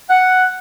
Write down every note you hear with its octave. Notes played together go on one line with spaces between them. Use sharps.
F#5